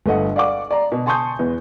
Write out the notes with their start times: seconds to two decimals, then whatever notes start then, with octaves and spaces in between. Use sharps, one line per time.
0.06 G1 A3 D#5 F#5
0.36 D5 F5 F#5 D6
0.71 D5 A#5
0.92 B2
1.06 G#5 A5 C6 C#6 D#6 G6
1.39 E2 B3